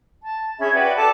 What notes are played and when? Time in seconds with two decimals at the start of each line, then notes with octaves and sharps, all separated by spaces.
0.24 A5
0.59 C#4 G#4 E5 B5
0.74 F#4 B4 D5 G5
0.96 A4 A5 D6